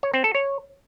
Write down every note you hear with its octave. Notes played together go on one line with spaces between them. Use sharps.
C#5
C4
A4
C#5